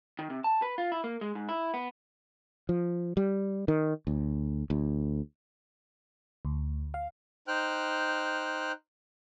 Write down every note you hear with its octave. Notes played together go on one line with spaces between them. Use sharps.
D#3
C3
A5
B4
F4
E4
A#3
G#3
G#2
E4
B3
F3
G3
D#3
D2
D2
D2
F5
D#4 C5 G5 F6 F#6